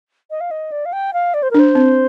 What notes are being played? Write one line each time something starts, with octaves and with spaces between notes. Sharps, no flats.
D#5
F5
D#5
D5
F5
G5
F5
D5
C5
A#4
D4 C5
C4